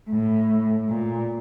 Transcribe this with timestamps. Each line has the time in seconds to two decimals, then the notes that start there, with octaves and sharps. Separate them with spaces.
0.10 A2
0.89 A#2